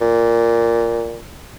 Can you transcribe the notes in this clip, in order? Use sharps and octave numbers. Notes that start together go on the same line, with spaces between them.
A#2